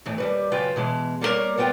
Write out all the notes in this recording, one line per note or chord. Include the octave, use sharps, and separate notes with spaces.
F2 A2 E3
D#2 G3 B4
F#2 C#3 F4 B4 G5
B2 E3 G#3
G3 A#3 B3 A#4 C#5
G3 B3 F4 G5